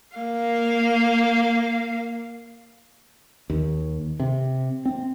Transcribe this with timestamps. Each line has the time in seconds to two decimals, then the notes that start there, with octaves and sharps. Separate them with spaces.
0.16 A#3 F5
3.50 D#2
4.20 C3
4.85 C4